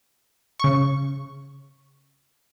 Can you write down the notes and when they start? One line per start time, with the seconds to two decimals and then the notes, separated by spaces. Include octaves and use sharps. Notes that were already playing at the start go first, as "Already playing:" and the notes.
0.60 C#3 C#6